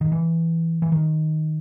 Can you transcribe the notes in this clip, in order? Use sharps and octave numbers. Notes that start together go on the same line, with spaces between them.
D#3
E3
E3
D#3